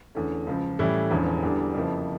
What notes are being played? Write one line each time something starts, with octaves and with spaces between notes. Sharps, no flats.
E2 D3 A3 C#4
C#2 C#3 F3
A2 E3 G3 C#4 E4
E1 E2 D3 F3 C#4
E2 D3 G3 D4
F2 C#3 F3 A#3 E4